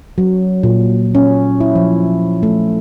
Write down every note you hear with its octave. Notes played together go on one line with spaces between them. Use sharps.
F#3
A#2
C#4
E4
F3
A3